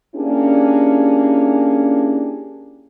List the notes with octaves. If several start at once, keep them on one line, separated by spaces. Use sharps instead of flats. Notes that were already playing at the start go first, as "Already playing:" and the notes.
A#3 C#4 D4 E4 G4 G#4